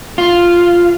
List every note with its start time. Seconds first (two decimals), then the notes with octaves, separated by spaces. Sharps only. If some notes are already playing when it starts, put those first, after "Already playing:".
0.18 F4